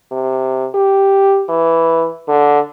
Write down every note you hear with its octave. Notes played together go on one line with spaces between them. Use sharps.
C3
G4
E3
D3